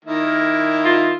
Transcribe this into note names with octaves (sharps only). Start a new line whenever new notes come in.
D#3 A#3 E4
F4